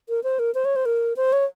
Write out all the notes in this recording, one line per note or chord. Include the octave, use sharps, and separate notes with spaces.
A#4
C5
A#4
C5
C#5
C5
A#4
C5
C#5